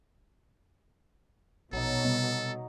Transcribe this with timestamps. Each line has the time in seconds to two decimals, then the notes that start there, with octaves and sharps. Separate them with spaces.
1.73 A#1 B2 F#3 D#4 A4
2.05 C3 G3 B3 D#4